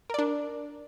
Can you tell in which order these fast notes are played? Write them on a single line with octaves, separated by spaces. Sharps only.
A#4 D5 D4